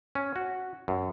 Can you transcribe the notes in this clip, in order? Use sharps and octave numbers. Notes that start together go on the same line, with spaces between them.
C#4
F#4
F#2